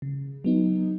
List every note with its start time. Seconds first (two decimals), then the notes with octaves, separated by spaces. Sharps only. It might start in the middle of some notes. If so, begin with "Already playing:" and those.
0.02 C#3
0.44 F#3 B3 D#4